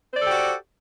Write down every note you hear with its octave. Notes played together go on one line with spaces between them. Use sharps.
F#4 G4 A4 C5 D5